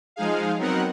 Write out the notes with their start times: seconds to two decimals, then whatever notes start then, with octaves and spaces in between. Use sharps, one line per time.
0.16 F3 G#3 D#4 G#4 F5
0.58 F#3 B3 C4 D#4 A#4 F#5